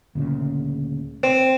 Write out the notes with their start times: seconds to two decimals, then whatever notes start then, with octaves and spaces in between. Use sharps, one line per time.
0.15 D2 A#2 C#3
1.23 C4